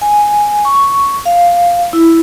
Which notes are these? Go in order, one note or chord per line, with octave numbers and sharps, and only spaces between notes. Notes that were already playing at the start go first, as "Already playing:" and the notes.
G#5
C#6
F5
E4